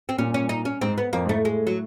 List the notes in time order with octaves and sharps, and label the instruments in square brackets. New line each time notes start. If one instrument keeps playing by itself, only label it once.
[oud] C4
[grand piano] A#2 [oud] C#4
[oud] C#4
D#4
C#4
[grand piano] G#2 [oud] C4
[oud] B3
[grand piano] F2 [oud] A#3
[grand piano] G#2
[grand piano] A2 [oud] A3
[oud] G#3
F#3